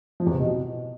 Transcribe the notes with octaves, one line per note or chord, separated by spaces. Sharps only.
F3
E2
C3
B2